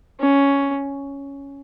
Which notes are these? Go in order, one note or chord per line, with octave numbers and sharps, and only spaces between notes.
C#4